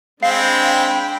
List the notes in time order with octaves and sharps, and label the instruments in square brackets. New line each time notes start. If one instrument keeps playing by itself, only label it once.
[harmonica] G#3 C4 [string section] D4 G5 B5 [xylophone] F5 C7